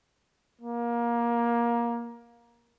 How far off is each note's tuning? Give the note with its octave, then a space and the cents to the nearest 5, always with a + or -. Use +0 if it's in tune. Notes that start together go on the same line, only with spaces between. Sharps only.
A#3 +20